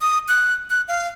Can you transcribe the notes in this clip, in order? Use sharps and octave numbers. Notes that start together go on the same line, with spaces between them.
D#6
F#6
F#6
F5